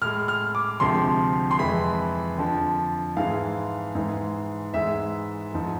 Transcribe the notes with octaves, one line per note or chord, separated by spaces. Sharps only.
A2 G#3 F6
F6
D6
D2 C3 F3 G#3 C6
C6
F2 E3 G#3 B5
F2 D3 F3
G#2 E3 G#3 F5
G#2 E3 G#3
G#2 E3 G#3 E5
G#2 F3 G#3